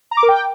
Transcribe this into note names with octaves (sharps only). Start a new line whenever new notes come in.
A#5
D6
A#4
G5